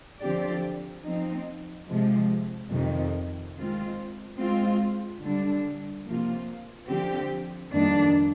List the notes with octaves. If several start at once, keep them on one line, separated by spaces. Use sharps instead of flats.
D3 F3 C4 G4 D5
F3 C4 D#4
C3 F3 G#3
F2 C3 D#3
D#3 G#3 C4 F4
G#3 C4 F4
D3 G3 D4
C3 F3 A#3 F4
D3 F3 C4 G4
F2 D#3 G3 A#3 D4